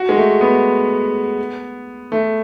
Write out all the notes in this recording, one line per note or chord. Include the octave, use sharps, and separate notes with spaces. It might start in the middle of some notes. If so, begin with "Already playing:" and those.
Already playing: F#4
G#3
A3
B3
A3